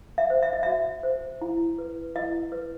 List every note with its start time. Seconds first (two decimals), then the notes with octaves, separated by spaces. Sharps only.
0.18 E5
0.30 C5
0.43 E5
0.53 D#5
0.63 F#4 E5
1.03 C5
1.42 E4
1.78 B4
2.15 E4 D#5
2.52 B4